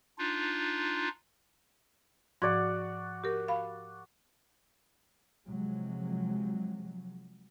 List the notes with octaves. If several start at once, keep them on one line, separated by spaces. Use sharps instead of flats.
D4 D#4 F4
G#2 F3 F#4 D5 F#5 G#6
G4 A#4
F5 B5
C3 F3 F#3 G#3